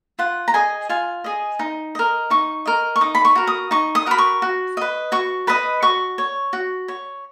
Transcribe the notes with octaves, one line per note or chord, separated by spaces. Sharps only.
F4 F#5
A#5
G#4 D#5 G#5
F4 G#5
G#4 D#5
D#4
A#4 D#5
D#4 C#6
A#4 D#5
C#6
D#4 D#6
B5
C#6
F#4 A#4
D#6
D#4 C#6
D#6
F#4 A#4 B5
C#6
F#4
B4 D#5
F#4 C#6
B4 D#5 B5
F#4 C#6
C#5
F#4
C#5